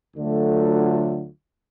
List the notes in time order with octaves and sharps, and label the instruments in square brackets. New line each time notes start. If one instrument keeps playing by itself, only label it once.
[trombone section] D2 D3 F#3 A3 F4